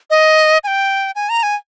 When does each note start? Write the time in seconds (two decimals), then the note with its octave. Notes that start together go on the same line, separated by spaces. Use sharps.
0.10 D#5
0.64 G#5
0.67 G5
1.16 G#5
1.29 A#5
1.43 G#5